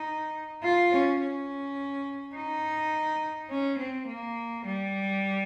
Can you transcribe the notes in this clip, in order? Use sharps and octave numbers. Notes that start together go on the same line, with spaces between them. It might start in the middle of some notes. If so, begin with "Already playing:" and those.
Already playing: D#4
F4
C#4
C#4
D#4
C#4
C4
A#3
G3